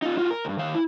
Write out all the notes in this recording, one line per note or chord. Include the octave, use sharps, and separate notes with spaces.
D#4 F4
F4 F#4
A#4
C#2 G2
D#3 F5
E4